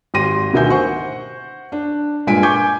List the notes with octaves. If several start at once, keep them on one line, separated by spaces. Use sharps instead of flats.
G#1 G4 C6 A#6 D#7
D2 B2 D#3 E5 G#5 G6
C5 F#5 C#6
D4
G2 A#2 G#3 G#5 B6 D7
G#5 C#6 D6 G6 G#6